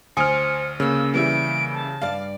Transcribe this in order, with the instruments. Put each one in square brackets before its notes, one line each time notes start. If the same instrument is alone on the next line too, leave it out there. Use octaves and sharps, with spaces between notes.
[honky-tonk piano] D2 D#6 D7 [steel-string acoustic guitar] C5 [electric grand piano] G#5 F6 [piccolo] C#7
[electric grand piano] C#3 [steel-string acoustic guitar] A#3 C#4 [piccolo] E6
[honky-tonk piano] E3 G3 E4 [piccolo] D7
[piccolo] A5
[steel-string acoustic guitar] G2 D5 [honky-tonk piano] F5